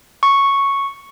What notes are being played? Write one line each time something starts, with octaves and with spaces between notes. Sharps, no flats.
C#6